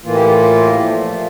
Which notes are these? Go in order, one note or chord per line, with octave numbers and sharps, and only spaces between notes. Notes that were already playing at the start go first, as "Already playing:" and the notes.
A2 E3 A#3 F4
G4
F4
G4
A#2 F3 A3 F4